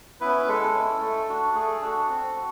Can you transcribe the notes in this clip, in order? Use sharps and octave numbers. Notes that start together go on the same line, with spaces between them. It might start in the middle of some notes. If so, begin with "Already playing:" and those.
B3 C#4 E4 B4
G#3 A4
C#4 E4
A3
D4 F#4
A3 G#4
D4 F#4 A4
C4
F#4